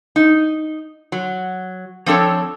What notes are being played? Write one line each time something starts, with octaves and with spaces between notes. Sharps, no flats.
D#4
F#3
F3 C4 D4 A4 C#5